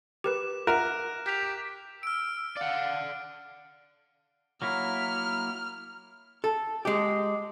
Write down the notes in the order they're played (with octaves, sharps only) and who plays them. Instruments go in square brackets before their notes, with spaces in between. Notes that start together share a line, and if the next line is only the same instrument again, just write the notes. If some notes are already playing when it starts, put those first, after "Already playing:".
[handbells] G4 A#4 B4 [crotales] D6 E7
[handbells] F4 E5 F#5 [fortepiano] A#4 [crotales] F#6
[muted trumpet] G4 [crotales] B6 F7
[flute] E6 [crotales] F6 D7
[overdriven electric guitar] D5 F#5 [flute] F5
[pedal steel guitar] F#3 A#3 E4 [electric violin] F6
[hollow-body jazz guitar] A4
G#3 G4